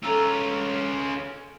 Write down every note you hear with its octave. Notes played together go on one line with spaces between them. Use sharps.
C#4 F4 A4 A#5 E6